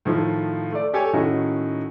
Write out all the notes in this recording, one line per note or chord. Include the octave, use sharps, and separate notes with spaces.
A2 D#3 F3 F4
A3 D5
G4 A4 C#5 G#5
A2 D#3 C#4 D#4 F#4